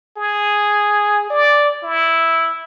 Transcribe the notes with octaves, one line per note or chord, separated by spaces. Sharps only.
G#4
D5
E4